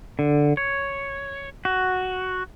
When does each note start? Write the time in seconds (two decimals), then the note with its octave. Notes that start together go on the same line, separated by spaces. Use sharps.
0.19 D3
0.57 C#5
1.65 F#4